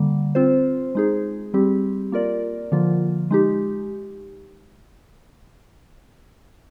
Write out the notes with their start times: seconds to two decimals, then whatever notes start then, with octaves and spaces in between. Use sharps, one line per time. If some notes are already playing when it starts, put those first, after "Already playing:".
Already playing: D3 G3 A#3
0.35 C4 F4 C5
0.95 G#3 D#4 G#4
1.54 G3 C4 G4
2.12 A#3 F4 A#4 D5
2.72 D3 F3 A#3 F4
3.31 G#3 D#4 G4